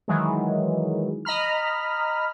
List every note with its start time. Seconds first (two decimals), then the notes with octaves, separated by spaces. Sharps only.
0.08 D#3 E3 F#3 G#3
1.25 D#5 A#5 B5 F6